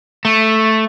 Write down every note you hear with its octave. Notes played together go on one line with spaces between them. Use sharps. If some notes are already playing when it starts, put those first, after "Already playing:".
A3